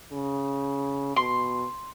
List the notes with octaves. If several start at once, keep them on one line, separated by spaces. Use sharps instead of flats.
C#3
B2 C6